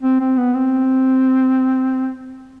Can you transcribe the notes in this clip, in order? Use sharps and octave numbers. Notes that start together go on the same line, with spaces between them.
C4
C4
B3
C4